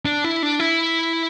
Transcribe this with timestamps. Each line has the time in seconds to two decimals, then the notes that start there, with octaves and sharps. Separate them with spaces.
0.06 D4
0.24 E4
0.43 D4
0.60 E4